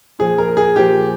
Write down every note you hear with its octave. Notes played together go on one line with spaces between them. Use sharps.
A#2 F3 G#4
A#4
G#4
A#2 F3 G4